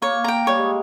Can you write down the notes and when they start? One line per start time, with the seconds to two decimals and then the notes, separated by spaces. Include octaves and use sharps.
0.02 A#3 C#5
0.24 G5 A#5
0.47 G3 C#5
0.59 G#3